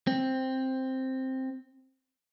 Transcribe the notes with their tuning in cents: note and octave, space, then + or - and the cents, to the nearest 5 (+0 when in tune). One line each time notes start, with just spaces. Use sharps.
C4 +5